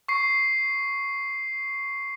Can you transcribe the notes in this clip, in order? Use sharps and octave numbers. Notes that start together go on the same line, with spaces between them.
C#6 C7